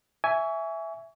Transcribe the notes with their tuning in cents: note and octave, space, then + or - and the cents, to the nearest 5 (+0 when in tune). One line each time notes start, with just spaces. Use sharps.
E5 +0 G#5 +0 C#6 +35